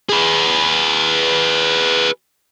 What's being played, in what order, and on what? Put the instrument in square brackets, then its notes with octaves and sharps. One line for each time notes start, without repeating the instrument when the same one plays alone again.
[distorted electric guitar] G#4 B4